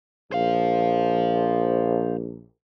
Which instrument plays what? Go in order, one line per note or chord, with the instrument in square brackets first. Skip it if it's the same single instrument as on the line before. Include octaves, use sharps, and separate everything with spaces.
[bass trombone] A#1 [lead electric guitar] C5 F5